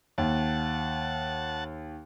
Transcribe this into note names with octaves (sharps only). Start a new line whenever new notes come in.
D#2 F#5 A5